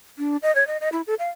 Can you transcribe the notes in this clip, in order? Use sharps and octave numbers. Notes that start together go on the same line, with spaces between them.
D4
D#5
C#5
D#5
D#5
E4
A4
F5